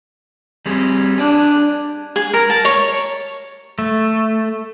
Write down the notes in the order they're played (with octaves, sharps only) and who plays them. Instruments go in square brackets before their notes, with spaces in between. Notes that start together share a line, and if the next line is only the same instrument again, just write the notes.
[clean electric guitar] G3 C4 G#4
[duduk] D4 [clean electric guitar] G#4 D5
[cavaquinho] G#4
A#4
A5
C#5
[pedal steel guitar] A3